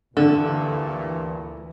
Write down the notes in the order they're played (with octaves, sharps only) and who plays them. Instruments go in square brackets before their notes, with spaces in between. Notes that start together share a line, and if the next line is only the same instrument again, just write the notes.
[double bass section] D2 E3 [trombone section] G2 A#2 A3 [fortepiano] D3 [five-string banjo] A4